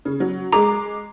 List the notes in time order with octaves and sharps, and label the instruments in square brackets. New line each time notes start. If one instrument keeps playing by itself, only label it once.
[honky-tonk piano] C#3
F#3
[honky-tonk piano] G#3 D6 [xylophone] A#5